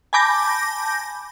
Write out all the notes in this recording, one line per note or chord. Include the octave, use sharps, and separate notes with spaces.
G#5 A5 B5 D6 G6 A#6